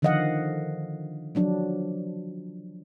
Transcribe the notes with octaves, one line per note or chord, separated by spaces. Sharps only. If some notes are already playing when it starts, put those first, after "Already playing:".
D3 D#3 F3 D#5 F5 F#5
F3 F#3 D4